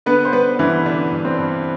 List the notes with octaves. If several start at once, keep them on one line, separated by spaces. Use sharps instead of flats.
D3 B3 B4
C5
G3 B3 B4
G2 E3 E4
D3 D4
G2
C4
G2